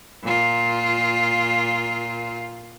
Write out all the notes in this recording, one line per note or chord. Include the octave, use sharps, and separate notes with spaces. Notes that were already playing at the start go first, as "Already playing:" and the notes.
A#2 F4